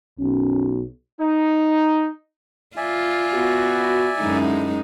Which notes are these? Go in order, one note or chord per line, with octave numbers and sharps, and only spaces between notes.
B1 C#4
D#4
F4 D5 E5 G#5
B3 F#4
F#2 D3 G#3 D#4 E4